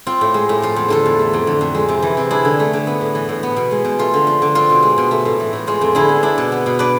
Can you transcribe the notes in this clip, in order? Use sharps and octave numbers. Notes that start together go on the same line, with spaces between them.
C4 F4
A2
G#3
A2
F3 F4
E2
D3 F4 A4
E2
A3
F2
D3
F2
G#3
C3
E3
C3
D4 E4 G#4
D3
A3
D3
B3
A2
E3
A2
B3
B2
G#3
B2
A3 F4
D3
F3
D3
C4 F4
B2
G#3
B2
A3
A2
E3
A2
G#3 F4
F2
D3 E4 G#4
B3
D4 E4
B2
B3
B2
D4 B4 D5